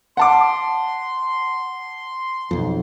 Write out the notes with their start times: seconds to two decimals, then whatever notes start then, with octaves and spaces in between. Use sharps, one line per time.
0.17 F#5 A5 C6 D6
2.51 B1 F2